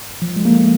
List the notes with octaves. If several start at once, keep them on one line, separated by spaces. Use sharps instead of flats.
F3
G#3
A#3
A3